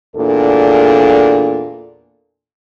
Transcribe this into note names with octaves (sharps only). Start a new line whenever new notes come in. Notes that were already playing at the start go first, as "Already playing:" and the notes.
E2 A#2 D4 A4